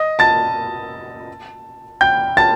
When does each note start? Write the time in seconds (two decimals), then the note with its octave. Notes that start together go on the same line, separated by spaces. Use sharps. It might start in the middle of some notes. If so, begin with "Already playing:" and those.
Already playing: D#5 D#6
0.19 A5 A6
2.01 G5 G6
2.37 A5 A6